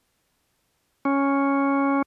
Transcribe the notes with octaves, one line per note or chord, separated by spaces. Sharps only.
C#4